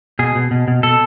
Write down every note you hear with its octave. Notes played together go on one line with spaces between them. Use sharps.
B2 G#4
B2
B2
B2
B2 A4